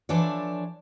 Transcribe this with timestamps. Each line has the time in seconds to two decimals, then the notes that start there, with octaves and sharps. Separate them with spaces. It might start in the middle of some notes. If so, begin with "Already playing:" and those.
0.09 E3 F3 D4 A4 C#5 D5